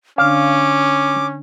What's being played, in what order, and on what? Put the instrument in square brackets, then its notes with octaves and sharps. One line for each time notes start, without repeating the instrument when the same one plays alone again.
[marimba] D3 D4 [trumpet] C#4 [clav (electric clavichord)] F5 [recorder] D6